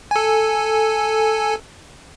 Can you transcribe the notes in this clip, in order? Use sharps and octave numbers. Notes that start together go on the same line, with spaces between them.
A4 G#5